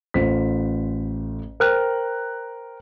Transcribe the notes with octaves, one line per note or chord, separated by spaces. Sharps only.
A1 F4 C5 B6
A#4 C5 G5 F6 F#6